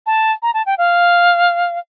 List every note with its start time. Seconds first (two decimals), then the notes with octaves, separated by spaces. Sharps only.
0.06 A5
0.42 A#5
0.54 A5
0.66 G5
0.78 F5